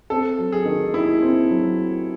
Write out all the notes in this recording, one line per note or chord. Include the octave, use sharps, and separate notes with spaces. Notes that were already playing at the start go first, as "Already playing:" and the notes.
C4 A4
F#3
G#4
D#3
D#2 E4
C4
F#3